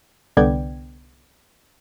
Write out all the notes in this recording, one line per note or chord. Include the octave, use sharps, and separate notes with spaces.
C2 D3 B3 D5 G5 G#6